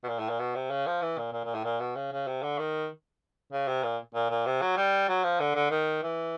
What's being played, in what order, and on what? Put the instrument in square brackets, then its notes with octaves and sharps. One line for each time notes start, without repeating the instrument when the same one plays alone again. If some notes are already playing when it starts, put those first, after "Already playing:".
[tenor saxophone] B2
A#2
A2
A#2
B2
C3
C#3
F3
E3
A#2
A#2
A#2
A2
A#2
B2
C#3
C#3
C3
D3
D#3
C#3
C3
A#2
A#2
A#2
C3
F#3
G3
F#3
F3
D3
D3
D#3
E3